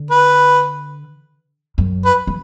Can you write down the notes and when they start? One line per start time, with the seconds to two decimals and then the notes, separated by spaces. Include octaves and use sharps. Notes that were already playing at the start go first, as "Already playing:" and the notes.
Already playing: D3
0.11 B4
1.78 F#2
2.05 B4
2.27 F3